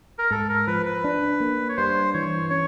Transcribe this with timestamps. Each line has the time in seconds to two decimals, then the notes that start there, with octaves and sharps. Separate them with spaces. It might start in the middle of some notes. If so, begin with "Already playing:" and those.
0.19 A#4
0.31 G#2 A4
0.49 A#4
0.67 F3 B4
0.86 B4
1.04 D4
1.40 A#3
1.69 C#5
1.77 G2 C5
2.14 E3 C#5
2.50 C#4 C#5